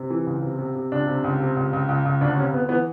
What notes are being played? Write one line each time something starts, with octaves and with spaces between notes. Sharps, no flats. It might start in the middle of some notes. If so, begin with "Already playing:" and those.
Already playing: C3
E3
C#2
C3
C3
C3
C#2 D4
C3
C#2
C3
C#2
C#2
C#2
C#2
D2 D4
C3 C#4
D2 B3
E3 B3